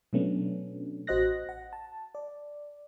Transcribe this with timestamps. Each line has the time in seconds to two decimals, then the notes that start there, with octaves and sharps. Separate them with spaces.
0.13 B2 F#3 A3 B3 C#4 D4
1.07 A1 F#4 C5 D#5 F#6 A#6
1.49 F#5
1.73 A5
2.15 D5